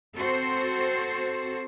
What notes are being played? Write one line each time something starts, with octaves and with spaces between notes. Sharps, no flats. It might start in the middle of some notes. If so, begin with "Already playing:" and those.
C4 F#4 A4 C5